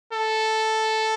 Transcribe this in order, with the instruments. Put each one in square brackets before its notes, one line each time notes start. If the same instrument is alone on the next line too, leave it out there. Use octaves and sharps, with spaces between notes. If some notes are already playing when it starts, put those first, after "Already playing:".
[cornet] A4